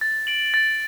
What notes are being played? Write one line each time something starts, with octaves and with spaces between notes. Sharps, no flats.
A6
D7 F#7
A6